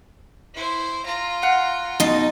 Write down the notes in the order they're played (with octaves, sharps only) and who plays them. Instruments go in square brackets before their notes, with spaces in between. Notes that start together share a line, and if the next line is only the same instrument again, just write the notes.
[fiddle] E4 C5
F4 A#5
[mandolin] F5 F#5
[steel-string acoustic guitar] B2 D#4 [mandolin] D#5 A5 C6